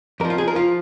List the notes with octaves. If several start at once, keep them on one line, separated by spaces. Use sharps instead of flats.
F2 F3 A#4
F4
G#4
A#4
F3 F4